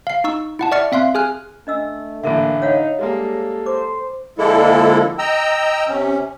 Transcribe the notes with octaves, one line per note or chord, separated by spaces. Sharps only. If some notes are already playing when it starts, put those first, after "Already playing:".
F5 C7
D#4 C#6 E6
E4 F#5 A5
D5 E5 C#6 F6 A6 C#7
C4 E5 F5 C6 F#6
G#4 G#5 F6 F#6
A3 D4 D#5 E6
A1 D3 A#3 A4 A#4 E5
D#4 C#5 F5 F#5
G3 G#3 A#3 A4
C5 D6
D3 F3 G#3 A#3 E4 A4
D#5 G5 A#5 E6
C3 C#4